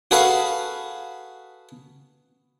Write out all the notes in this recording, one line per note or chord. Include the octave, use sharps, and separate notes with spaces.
F#4 G#4 A4 B4 F5